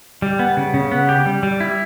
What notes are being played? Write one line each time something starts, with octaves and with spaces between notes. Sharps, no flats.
G3
B3
C#3
C#3
B3
G4
G3
G3
E4